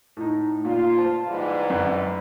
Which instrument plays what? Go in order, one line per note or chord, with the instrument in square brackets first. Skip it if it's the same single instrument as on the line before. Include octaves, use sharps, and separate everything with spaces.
[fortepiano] A2 D#4
[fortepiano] A#2 [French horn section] F4
[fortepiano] C5 A5
[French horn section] G#2 E3 G3
[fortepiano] F#2